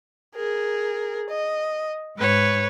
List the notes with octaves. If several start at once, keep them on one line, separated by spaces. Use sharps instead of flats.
G#4 A#4
D#5
G#2 B4 C#5